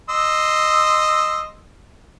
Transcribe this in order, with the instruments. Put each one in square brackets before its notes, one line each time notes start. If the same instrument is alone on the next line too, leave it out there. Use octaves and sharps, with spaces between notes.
[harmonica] D#5 C6 E6